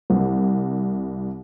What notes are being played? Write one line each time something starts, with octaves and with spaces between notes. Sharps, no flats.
C2